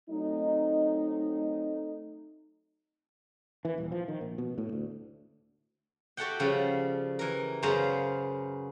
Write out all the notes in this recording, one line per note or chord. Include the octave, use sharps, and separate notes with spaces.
F#3 A3 C4 D#4
E3
D#1
F3
D#3
A#1
B2
A2
D2
F#4 G4 A4 E5 F#5 G5
C#3 F3 G3
E3 A#4
F#2 C#3 B3 C5 F5 A#5